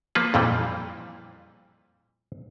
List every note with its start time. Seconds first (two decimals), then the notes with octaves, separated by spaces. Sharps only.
0.15 F3 A#3 F4 B4
0.34 F2 A#2 E3 G3